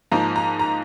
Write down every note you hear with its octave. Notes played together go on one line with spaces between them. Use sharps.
G#2 F3 A#3 D#4 A#5
A#5
A#5